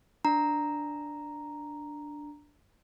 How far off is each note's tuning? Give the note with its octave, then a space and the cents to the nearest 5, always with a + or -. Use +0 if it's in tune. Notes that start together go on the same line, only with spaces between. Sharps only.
D4 +0 A#5 +0